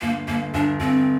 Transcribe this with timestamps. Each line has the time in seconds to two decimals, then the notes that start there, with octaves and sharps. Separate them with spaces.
0.02 G1 A#3
0.28 G1 A#3
0.54 G1 D4
0.80 G1 C4